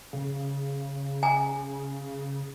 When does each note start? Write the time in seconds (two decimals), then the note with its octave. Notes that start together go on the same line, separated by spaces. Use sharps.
0.13 C#3
1.23 G#5 A#5